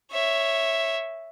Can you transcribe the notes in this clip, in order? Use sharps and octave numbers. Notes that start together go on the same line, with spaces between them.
C#5 E5